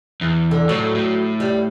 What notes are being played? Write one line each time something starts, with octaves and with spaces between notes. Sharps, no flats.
E2
D3
A2 F#3
A2
G3